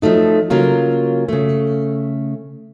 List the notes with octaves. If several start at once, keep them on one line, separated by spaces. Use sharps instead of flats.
F3 F#3 A3 D#4
C#3 F#3 A#3 F4
C#3 A3